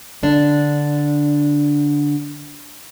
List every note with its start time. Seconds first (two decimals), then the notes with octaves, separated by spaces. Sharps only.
0.23 D3 D4